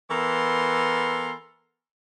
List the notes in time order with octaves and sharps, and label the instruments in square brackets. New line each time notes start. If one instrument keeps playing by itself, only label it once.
[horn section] E3 B3 A4 A#4 C6